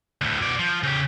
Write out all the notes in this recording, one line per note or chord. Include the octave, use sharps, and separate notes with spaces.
D2 A2
B2 D5
F3
C#3 G4